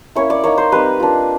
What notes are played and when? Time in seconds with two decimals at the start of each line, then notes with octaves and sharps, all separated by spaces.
0.16 A#3 C#4 E4 C#5
0.30 D5
0.44 A#3 D#4 C#5
0.58 C5
0.72 G3 C4 D#4 B4
1.00 A#3 D4 F4